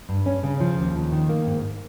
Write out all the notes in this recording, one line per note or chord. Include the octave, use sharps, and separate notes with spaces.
G2
C#4
C#3
F3
D#2
D#2
D#3
A#3
G#2